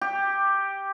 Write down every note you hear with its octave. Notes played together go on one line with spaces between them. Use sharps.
G4